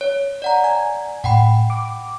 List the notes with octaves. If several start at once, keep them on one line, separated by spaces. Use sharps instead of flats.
C#5
D5 F#5 A#5
G#5
A2 F#5 G5 B5
D6